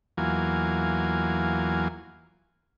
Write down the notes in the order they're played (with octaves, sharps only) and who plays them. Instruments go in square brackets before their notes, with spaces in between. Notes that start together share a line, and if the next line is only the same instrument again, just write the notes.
[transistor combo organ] E2 F#3 A#3 F4 G#5